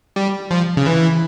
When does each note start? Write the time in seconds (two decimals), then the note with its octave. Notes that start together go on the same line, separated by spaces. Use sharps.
0.16 G3
0.51 F3
0.77 C#3
0.86 E3